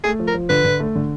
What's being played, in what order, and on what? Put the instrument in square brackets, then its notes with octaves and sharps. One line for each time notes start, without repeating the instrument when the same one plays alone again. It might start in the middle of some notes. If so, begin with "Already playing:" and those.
[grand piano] A3 [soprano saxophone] G#4
[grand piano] F3
[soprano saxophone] A#4
[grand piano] F3
[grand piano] D3 [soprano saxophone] B4
[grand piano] D3
A3
D3